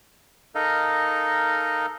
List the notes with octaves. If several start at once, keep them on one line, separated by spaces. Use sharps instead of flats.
D#4 A4 A#4 D#5 F5